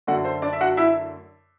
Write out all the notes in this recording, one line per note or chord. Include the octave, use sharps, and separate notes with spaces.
F#2 D3 A3 F#4 F#5
C5
D4 D5
E5
F#4 F#5
E4 E5